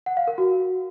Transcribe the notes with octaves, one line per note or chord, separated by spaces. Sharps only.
F#5
F5
A#4
F#4